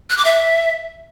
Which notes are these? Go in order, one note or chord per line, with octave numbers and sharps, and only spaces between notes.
F#6
D6
E5